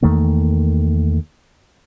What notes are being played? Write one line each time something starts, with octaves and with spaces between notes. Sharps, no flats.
E2 D#3 A3 A#3